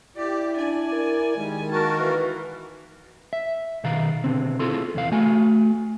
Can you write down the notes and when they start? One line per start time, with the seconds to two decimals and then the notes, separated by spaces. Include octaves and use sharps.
0.17 E4 G4 D5
0.57 D4 D5 G#5
0.92 A#4
1.37 D#3 G3 G#3
1.71 A#3 F#4 A#4 A5
2.00 E3 B4
3.33 E5
3.84 B2 D#3 F5 A#5
4.24 B2 D3 C4
4.59 E4 F4 G#4 A4 C6
4.94 E2 C3 F5
5.12 A3 F#4 G#5